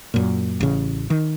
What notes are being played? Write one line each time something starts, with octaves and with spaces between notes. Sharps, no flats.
F#2 A#2
A1 C#3
D#3